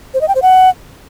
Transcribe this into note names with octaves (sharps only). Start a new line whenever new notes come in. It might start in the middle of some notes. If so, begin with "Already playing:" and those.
C5
D#5
G5
C5
F#5